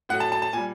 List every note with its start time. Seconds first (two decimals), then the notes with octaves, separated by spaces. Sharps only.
0.09 A2 F#3 F#5
0.20 A5
0.32 A5
0.42 A5
0.53 A#2 G3 G#5